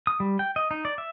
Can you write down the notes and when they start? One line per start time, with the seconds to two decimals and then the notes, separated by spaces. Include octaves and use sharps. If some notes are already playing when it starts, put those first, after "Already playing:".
0.07 D#6
0.20 G3
0.39 G5
0.56 D#5
0.71 D#4
0.85 D5
0.98 E5